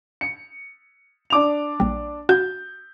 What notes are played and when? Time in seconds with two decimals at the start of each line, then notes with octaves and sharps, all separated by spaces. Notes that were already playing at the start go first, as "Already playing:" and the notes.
0.21 C#7
1.30 D4 D6 F7
1.80 A#1 G3
2.29 F#4 G6